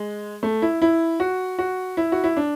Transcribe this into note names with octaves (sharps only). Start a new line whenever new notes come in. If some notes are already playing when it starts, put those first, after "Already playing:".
Already playing: G#3
A3
E4
E4
F#4
F#4
E4
F#4
E4
D4